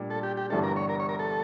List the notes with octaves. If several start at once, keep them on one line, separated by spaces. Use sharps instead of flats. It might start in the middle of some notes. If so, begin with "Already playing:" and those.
Already playing: A#2 G3 D4
A4
G4
G4
G1 G2 E3 G3 D4 A4
A#4
C#5
A#4
C#5
A#4
A4